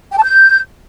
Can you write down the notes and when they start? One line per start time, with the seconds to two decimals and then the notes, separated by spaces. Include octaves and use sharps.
0.11 G5
0.18 A5
0.24 G6